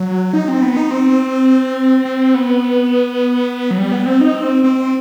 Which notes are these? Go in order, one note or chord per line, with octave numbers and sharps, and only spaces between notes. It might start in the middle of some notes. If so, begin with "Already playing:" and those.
Already playing: F#3
D#4
C4
B3
D#4
C4
C4
B3
F#3
G3
B3
C4
D#4
C4
C4